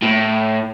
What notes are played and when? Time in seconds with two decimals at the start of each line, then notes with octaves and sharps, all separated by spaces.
0.03 A2